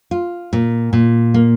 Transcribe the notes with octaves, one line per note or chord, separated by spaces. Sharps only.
F4
A#2
A#2
A#3